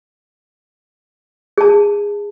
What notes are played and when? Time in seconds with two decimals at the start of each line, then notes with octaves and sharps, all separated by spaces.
1.58 G#4 A5